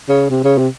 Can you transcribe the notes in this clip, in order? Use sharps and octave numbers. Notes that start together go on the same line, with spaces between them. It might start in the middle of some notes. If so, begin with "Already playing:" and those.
C#3
C3
C#3
C3